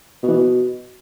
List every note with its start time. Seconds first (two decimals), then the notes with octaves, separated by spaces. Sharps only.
0.23 B2
0.28 E3
0.33 B2